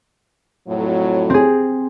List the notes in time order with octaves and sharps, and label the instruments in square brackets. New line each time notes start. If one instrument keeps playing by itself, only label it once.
[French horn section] F2 A2 F#3
[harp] C4 G#4